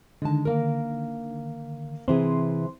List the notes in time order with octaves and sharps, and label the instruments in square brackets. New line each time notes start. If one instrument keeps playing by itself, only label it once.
[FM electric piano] D3 D#3 [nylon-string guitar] G#3 A5
[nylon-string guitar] A#3 A#4
[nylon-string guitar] C3 E3 G#4 [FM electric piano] C4 C6